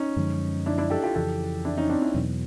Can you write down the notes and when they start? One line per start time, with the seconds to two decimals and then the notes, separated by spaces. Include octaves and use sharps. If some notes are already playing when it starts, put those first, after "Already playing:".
Already playing: C#4 D#4
0.16 F#2 D3 F3 G#3
0.66 D4 E4
0.78 D4 E4
0.90 G4 A4
1.03 F4 G4
1.15 F2 C#3 E3 G4 A4
1.65 D4 E4
1.78 C#4 D#4
1.90 C4 D4
2.02 D4 E4
2.14 E2 B2 F#3